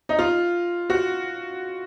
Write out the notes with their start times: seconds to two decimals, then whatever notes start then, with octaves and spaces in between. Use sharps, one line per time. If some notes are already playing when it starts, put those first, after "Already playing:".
0.09 D#4
0.19 F4
0.90 F#4